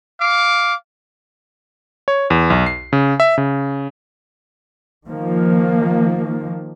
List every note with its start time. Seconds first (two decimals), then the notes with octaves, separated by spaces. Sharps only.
0.20 F5 D6
2.08 C#5
2.30 E2
2.50 B1
2.66 C7
2.93 C#3
3.20 E5
3.38 C#3
5.07 D#3 F3 A#3